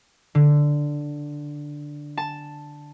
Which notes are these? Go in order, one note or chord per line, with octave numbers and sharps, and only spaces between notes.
D3
A5